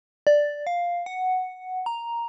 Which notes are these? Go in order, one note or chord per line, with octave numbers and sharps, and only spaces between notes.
D5
F5
F#5
A#5